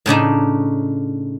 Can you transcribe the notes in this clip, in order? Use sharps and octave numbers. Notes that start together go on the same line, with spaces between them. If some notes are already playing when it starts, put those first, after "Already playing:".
A2 C#3 D4 D#4